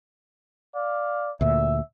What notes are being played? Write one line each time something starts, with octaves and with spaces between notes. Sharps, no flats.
D5 F5
D2 A#2 E5